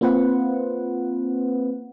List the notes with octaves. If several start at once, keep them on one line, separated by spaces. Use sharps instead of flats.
A#3 C4 F4 B4 C5 F#5